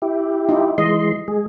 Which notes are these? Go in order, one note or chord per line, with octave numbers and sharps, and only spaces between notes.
E4 G4
D#4 F4
E3 G#3 D#5 C6
G#3 G#4